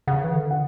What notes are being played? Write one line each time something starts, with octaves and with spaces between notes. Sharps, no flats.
C#3 F#5
E3
D3
F#5